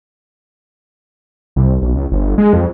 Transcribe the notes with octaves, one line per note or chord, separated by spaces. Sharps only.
C2
B1
C#2
G1
G#3
F2